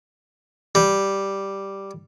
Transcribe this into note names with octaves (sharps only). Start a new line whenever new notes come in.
G3